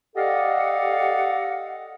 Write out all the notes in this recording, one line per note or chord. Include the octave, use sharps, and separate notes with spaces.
G4 A4 D5 D#5 F5 F#5